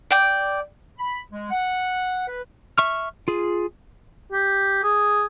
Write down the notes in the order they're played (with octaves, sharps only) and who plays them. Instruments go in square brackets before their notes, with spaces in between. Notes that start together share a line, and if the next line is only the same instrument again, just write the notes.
[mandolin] D5 G5
[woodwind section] B5
G#3
F#5
B4
[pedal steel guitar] E5 C#6 F6
F4 G#4
[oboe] G4
G#4